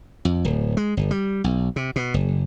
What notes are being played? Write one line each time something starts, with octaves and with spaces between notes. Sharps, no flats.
F2
D1
G#3
G1
G3
B1
C3
B2
F#1